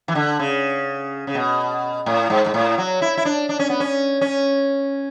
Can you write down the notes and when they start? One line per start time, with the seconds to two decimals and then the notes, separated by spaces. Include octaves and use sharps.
0.08 E3
0.15 D3
0.39 C#3
1.27 C#3
1.35 B2
2.06 A2
2.30 G#2
2.46 G#2
2.54 A2
2.78 F#3
3.02 E4
3.17 E4
3.25 D4
3.49 D4
3.59 C#4
3.69 B3
3.80 C#4
4.21 C#4